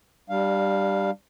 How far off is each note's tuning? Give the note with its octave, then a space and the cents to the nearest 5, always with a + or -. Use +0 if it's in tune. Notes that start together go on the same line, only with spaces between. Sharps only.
G3 +0 D4 +25 F5 +0